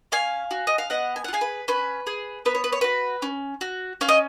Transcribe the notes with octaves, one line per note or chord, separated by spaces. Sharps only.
C#4 F5 G#5
F#4
D#5
F5
B3 D#5 F#5
G#5
F#5
F4
G#4 F5 G#5
B4
C#4 B4
G#4
B3 B4
C#5
B4
C#5
F#4 B4
C#4
F#4
C#4 F5
D#5